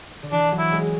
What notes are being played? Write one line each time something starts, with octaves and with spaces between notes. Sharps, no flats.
D3
E3 D4
F#3
E4
G#3